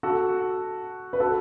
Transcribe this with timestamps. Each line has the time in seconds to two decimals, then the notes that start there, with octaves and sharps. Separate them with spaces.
0.03 F#4 A4
1.13 B4
1.20 F#4 A4